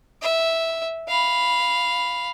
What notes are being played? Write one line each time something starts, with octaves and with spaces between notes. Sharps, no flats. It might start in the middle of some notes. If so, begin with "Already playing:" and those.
E5
F5 B5